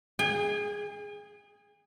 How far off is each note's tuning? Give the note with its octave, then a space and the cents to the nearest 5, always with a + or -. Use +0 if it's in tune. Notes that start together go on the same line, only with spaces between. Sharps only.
G#4 +0 G#5 -45